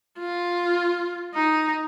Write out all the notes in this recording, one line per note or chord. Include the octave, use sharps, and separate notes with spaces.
F4
D#4